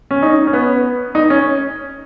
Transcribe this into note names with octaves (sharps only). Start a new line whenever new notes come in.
C#4
D#4
C#4
B3
D#4
C#4